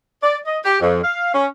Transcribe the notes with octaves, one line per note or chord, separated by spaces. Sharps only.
D5
D#5
G4
F2
F5
C#4